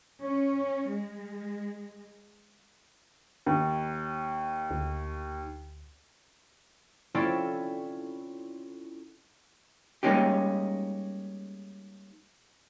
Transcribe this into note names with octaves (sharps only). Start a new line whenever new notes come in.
C#4
G#3
D#2
D2
C4 C#4 E4 F4 A4 D5
G3 G#3 A#3 C#4 D#4 G4